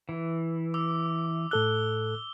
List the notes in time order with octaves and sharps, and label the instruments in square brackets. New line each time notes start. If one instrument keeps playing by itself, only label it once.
[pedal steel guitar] E3
[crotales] D6 E6
[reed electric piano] A2 A4 F#6 [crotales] E6 G7